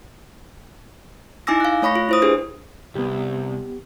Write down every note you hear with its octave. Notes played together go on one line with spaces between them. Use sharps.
D#4 E4 G#5 D6 E6 A#6
F5 F#6
A3 C#5 B5 C#6 A#6
F4
E4 C5 D#6
D4 G4 G#4 B4 C5
C2 B3 G4